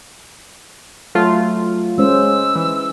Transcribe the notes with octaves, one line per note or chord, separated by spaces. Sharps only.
F#3 A3 F4
G#3 C#4 C5 E6
E3